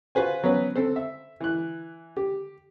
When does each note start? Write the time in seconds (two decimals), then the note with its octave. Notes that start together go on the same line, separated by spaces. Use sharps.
0.15 F4 F#4 B4 C5 G#5
0.44 F#3 B3 C#4 B4
0.76 C4 A4 C5
0.96 E5
1.41 E3 F#6
2.17 G4